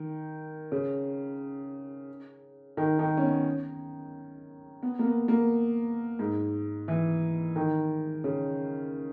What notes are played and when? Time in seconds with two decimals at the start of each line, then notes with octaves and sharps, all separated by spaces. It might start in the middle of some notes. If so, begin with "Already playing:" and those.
Already playing: D#3
0.72 C#3
2.77 D#3
2.99 D#3
3.17 C#4
3.22 B3
4.83 B3
4.99 A#3
5.05 B3
5.28 A#3
6.19 G#2
6.88 E3
7.56 D#3
8.24 C#3